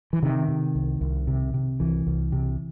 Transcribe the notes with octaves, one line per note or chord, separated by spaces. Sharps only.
E3
C3 D#3
C3
C2
C2
C3
C3
C2 E3
C2
C3